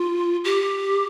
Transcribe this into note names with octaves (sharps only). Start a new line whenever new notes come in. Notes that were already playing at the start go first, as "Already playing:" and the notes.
Already playing: F4
G4